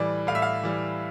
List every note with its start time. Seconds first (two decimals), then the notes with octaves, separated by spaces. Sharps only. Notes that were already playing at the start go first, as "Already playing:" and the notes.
Already playing: A2 E3 G3 D5
0.27 A2 F5
0.35 E5
0.42 F5
0.63 E3 G3